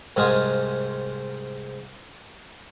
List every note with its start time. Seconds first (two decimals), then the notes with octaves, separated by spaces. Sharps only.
0.16 C2 G#2 G#3 F4 G#5 D#6